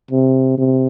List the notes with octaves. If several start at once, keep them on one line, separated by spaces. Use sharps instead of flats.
C3
C3